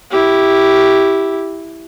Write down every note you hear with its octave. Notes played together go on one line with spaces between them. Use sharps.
E4 G4